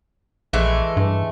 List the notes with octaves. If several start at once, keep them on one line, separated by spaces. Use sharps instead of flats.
A#1 E3 G#3 A3
G2